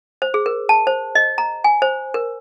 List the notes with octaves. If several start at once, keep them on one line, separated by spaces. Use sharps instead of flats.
C5
G#4
A#4
A5
C5
D#5
A#5
G#5
C5
A#4